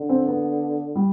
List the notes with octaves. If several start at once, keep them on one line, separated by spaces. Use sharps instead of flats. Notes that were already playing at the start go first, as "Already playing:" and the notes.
Already playing: D3
C4
B3
G3